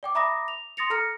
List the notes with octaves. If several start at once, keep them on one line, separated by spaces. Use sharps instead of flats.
D5 G5 D6
E5 A#5 B5 D6 D#6 A#6
F7
C6 D#6 A6 A#6 C#7 F7
A4 A#5 F6 A#6 C#7